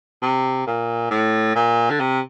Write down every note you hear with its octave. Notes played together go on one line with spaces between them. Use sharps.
C3
A#2
A2
A#2
D3
C3